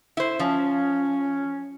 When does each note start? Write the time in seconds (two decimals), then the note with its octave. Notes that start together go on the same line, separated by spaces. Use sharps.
0.17 E4 C5
0.40 F3 C#4